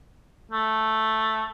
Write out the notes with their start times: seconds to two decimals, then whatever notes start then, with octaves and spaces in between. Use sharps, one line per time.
0.51 A3